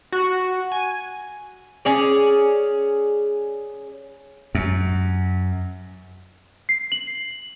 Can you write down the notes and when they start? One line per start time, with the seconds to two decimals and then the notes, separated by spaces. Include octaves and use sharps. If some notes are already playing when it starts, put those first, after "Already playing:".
0.12 F#4
0.72 G#5
1.85 C#4 G#4 D5
4.55 F#2
6.69 C7
6.92 F#7